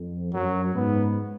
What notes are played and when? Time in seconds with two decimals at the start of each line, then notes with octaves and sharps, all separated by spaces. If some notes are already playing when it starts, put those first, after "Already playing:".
Already playing: F2
0.33 F#2 F#3
0.74 G#2 B3